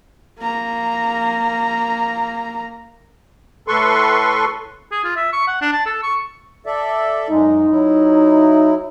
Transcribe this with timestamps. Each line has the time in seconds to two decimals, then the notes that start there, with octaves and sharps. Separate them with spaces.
0.39 A#3 A#5
3.68 A2 A4 B4 C6 C#6
4.92 G#4
5.04 F4
5.16 E5
5.33 C#6
5.47 F#5
5.61 D4
5.73 A5
5.86 A4
6.03 C#6
6.66 A4 D5 E5
7.30 F#2 G#3 D#4
7.71 F#3 E4